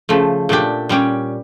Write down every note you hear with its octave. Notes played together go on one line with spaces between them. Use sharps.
C#3 F3 A3
A#2 A3 D4 G4
A#2 G3 C#4 G4